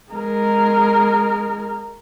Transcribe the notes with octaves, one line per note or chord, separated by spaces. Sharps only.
G#3 A#4